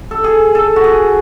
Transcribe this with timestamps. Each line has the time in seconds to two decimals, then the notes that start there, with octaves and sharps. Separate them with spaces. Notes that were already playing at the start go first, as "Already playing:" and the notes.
0.11 A4
0.24 G#4
0.55 A4
0.76 F#4
0.84 G#4